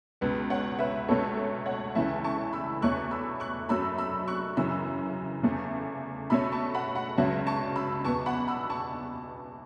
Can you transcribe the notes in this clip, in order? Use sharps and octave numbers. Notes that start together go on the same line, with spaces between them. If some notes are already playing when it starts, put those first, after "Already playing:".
C#2 B2 B3
C#5 F#5
B4 E5
C#2 B2 A3 C#4 A4 C#5
A4
C#5 F#5
C#2 C#3 E3 A3 E5 A5
A5 C#6
B5 E6
E2 B2 A3 C#4 C#6 F#6
B5 E6
C#6 F#6
F#2 F#3 A3 C#4 B5 E6
B5 E6
C#6 F#6
F#2 C#3 E3 C#4 B5 E6
E2 C#3 A3
B2 A3 C#4 B5 E6
A5 C#6
F#5 B5
F#5 B5
C#2 C#3 F#3 C#4 E5 A5
A5 C#6
B5 E6
E2 B2 B3 A5 C#6
F#5 B5
B5 E6
A5 C#6